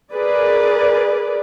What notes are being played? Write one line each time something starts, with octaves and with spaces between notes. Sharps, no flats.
G#4 A#4 B4 D5